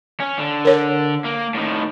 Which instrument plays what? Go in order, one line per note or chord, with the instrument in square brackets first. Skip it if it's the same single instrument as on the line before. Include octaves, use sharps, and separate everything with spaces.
[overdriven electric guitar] C#4
D3
[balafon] A#4 C#5
[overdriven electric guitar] A#3
A2 D#3